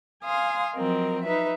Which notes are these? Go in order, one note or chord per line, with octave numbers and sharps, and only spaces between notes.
F5 G#5 C6 D#6
F3 F#3 C4 A#4 D#5
D#4 B4 E5